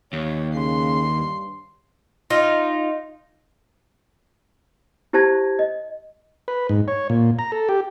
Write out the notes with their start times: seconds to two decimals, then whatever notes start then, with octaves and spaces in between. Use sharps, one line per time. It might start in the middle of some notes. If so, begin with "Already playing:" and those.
0.13 D#2 C#5
0.54 C#3 C6
1.16 G2
2.30 D#4 F4
5.13 E4 G4 C5 A5 G#6 A#6
5.59 D#5
6.48 B4
6.69 G#2
6.88 C#5
7.10 A#2
7.39 A#5
7.52 A4
7.69 G4